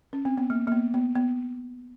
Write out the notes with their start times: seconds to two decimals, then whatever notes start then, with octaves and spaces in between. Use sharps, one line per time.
0.13 C#4
0.25 C4
0.37 B3
0.50 A#3
0.67 A#3
0.72 B3
0.94 B3
1.15 B3